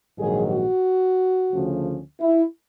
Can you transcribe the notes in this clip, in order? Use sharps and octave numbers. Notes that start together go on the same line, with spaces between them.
A#1 G#2 D#3 F#3 G#4
F#4
D2 C#3 F3 A3 C#4
E4